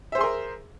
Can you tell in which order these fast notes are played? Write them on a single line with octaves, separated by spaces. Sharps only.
E5 C5 G#4 C6 A#4